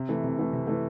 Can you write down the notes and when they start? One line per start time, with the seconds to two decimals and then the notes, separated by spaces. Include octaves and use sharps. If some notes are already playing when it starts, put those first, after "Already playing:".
Already playing: C3
0.09 E3 A3
0.24 C3
0.39 E3 A3
0.53 C3
0.67 E3 A3